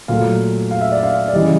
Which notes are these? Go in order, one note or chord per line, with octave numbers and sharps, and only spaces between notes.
A#2 F#3 A3 F5
F5
E5
D5
F5
D5
C#3 E3 G3 D#5